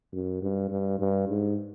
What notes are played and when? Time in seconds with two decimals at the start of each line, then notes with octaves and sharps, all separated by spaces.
0.12 F#2
0.42 G2
0.70 G2
0.99 G2
1.28 G#2